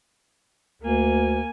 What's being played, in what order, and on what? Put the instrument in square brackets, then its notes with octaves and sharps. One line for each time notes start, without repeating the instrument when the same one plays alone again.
[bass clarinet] D2 [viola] A#3 G#5